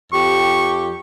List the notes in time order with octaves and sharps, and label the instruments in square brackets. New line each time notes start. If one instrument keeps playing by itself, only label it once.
[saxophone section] F2 G4 [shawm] C#6